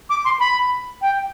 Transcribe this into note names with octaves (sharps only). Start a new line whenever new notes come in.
D6
C6
B5
G5